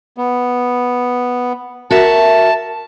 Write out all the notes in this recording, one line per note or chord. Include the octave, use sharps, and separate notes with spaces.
B3
F#4 A#4 E5 A5